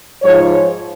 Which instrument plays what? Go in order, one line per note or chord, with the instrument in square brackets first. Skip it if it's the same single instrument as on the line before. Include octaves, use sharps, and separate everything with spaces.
[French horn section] G#2 F3 C#5